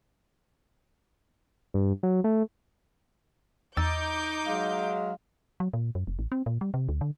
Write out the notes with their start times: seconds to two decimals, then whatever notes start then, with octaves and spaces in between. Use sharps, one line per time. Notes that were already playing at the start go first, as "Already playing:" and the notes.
1.74 G2
2.03 F#3
2.24 A3
3.77 E2 D#4 D6 E6 G6 A6
4.46 F#3 G#3 F5
5.60 F#3
5.73 A#2
5.95 F#2
6.07 F1
6.19 A1
6.32 C4
6.46 A#2
6.61 G3
6.74 C3
6.89 D2
7.01 D3